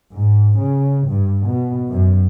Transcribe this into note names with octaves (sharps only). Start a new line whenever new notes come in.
G#2
C#3
G2
B2
F#2